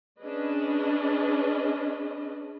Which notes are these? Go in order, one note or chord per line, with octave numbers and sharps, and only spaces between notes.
C#4 D4 G#4 B4 D#5